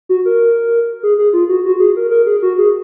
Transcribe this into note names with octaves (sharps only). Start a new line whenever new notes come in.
F#4
A#4
G#4
G#4
F4
F#4
F#4
G#4
A#4
A#4
G#4
F#4
G#4